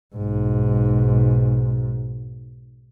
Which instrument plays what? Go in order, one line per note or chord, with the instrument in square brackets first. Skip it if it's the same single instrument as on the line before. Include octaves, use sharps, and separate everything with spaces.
[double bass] B1 G#2